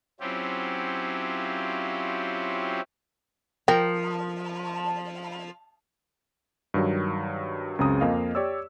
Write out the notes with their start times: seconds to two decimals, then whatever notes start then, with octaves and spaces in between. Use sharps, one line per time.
0.20 F#3 C4 C#4 E4 F4 G4
3.68 F3 A#4 G5
6.74 G2 D#3 F#3
7.79 C#2 F#2 C#3 C4 A#5 D#6
8.01 F2 A#3 D#5 F5
8.35 G4 C#5 D5 E6